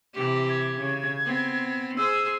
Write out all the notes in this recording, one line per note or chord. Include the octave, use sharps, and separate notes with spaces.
C3 E3 G4
G#6
C#3
B3 C4
G#4 C5 E6